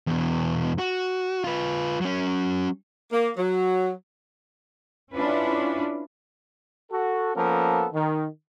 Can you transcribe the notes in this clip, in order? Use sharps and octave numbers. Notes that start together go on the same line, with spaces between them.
E2 B2
F#4
F4 B4
F#3 C#4
A#3
F#3
C#4 D4 E4 F4 B4
F#4 A4
F3 A#3 B3 C#4 A4 A#4
D#3